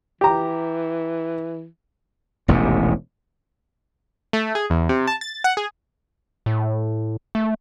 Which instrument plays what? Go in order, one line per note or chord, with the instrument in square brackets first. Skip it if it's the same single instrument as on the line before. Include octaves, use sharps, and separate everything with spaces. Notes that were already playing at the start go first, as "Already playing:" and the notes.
[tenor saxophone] E3 [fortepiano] G4 A#5
[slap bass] E1 A1 D#2 C3
[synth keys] A3
G#4
E2
C3
A5
A6
F#5
G#4
[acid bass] A2
A3